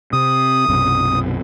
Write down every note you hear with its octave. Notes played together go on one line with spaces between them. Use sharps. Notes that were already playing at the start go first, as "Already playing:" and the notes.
C3 D#6
B1 F#2 C3